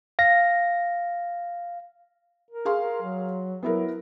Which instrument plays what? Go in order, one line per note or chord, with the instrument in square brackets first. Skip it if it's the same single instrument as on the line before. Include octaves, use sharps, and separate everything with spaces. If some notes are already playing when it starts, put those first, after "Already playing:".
[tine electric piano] F5 A#6
[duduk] A#4
[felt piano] G#4 F5 C6
[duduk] A#4
F#3
[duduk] F#3 [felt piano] B3 E4 A#4